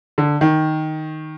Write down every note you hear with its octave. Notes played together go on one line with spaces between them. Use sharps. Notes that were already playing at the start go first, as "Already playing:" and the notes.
D3
D#3